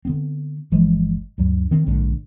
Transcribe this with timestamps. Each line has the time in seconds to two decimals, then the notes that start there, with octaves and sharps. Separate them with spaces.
0.05 D3 B3 C4
0.72 G1 E3 F3 G#3
1.38 D2 G2 F#3
1.71 D#3 C4
1.86 A#1 G#2 D3